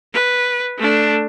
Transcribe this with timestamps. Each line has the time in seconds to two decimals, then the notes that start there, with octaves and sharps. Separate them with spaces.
0.13 B4
0.77 A3 D4